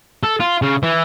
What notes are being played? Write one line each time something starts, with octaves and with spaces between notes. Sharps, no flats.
A4
F4
C#3
E3